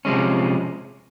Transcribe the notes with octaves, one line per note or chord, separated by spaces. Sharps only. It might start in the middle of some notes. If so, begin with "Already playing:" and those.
C3 F3 G#3 C#4